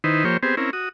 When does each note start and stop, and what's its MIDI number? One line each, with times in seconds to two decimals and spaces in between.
0.04 0.24 51
0.04 0.24 63
0.04 0.24 64
0.04 0.24 71
0.04 0.24 72
0.25 0.37 53
0.25 0.37 58
0.25 0.37 67
0.25 0.37 72
0.25 0.37 73
0.43 0.55 59
0.43 0.55 60
0.43 0.55 67
0.43 0.55 68
0.43 0.55 72
0.57 0.70 60
0.57 0.70 61
0.57 0.70 64
0.57 0.70 70
0.73 0.89 66
0.73 0.89 87